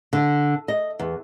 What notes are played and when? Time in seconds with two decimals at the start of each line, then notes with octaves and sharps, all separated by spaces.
0.13 D3
0.68 D#5
0.99 E2